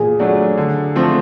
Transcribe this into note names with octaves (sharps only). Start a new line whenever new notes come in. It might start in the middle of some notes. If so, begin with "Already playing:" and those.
Already playing: A#2 G#4 G#5
F#3 A3 D4
D3
F3 A3 C4